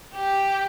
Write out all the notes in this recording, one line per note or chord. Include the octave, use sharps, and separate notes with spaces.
G4